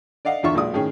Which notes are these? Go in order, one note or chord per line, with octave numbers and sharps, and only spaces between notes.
D5 D#5 F5 F#5
E2 D3 F4 E5 C#6
B1 A#2 G#3 D5 D#6
A2 D#3 C#4 G#4 G5